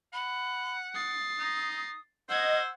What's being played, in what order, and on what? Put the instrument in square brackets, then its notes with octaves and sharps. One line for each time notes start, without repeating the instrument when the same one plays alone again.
[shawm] F#5 [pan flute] B5
[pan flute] D#6 [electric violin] A6 C7
[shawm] D#4
[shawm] C5 [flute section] D#5 [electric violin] F#5 G#6 [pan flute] E6